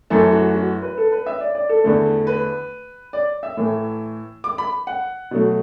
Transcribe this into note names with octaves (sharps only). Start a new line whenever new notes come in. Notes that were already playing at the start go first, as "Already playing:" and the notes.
F#2 E3 A3 A4
F#4
F#4
B4
A4
B4
E5
D5
D5
A4
E2 D3 A3
B4
D5
E5
A2 E3 A3
D6
B5
F#5
B2 F#3 A3